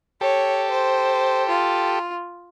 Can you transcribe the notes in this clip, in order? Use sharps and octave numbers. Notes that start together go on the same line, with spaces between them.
G4 A4 C#5
C5
F4